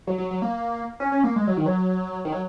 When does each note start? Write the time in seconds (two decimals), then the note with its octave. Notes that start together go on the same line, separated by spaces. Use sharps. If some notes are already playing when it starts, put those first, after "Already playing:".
0.07 F#3
0.18 F#3
0.31 F#3
0.42 A#3
1.00 C#4
1.12 C#4
1.24 A#3
1.36 G#3
1.47 F#3
1.57 D#3
1.66 F#3
2.25 D#3
2.32 F#3